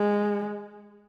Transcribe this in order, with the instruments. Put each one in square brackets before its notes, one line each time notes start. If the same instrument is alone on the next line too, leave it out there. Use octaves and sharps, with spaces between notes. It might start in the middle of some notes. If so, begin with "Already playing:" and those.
Already playing: [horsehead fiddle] G#3